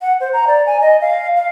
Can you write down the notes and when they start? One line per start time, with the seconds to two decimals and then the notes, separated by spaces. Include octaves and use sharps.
0.01 F#5
0.20 C5
0.33 A#5
0.47 D5
0.66 G#5
0.81 D#5
1.01 F5
1.36 F5